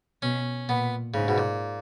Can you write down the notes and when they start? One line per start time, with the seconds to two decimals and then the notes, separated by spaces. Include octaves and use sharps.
0.22 B2 C#4
0.69 A#2 B3
1.14 G#2 C#3
1.28 B2
1.38 A#2